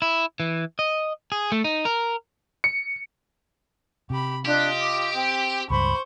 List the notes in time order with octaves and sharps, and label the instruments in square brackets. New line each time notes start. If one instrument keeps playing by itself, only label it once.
[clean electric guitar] E4
E3
D#5
G#4
A3
D#4
A#4
[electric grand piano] C#7
[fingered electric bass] C3 [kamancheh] G4 B5
[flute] D4 [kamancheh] F4 D#5 [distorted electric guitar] G4
[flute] D6
[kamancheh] C4 [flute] G5
[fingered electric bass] C#2 G2 [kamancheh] C5 C#6 [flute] B5